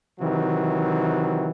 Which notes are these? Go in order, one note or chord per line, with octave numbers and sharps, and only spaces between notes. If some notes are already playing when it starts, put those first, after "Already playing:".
C3 D#3 E3 F#3